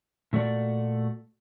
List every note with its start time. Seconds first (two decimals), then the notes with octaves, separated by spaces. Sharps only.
0.33 A#2 A3 F#4 D5